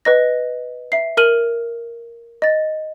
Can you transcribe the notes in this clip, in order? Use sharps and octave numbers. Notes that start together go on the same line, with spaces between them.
B4 D#5 A#6
E5 C7
A#4 F6 D#7 F#7
D#5 A6